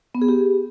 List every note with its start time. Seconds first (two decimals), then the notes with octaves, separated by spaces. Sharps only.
0.15 B3
0.22 G#4
0.29 G4